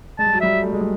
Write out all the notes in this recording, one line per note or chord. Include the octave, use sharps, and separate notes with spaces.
G#3 A5
G3
F#3
G3 E5
A3
G#3
G3